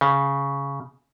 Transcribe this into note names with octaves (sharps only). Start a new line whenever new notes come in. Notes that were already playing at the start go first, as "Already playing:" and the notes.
C#3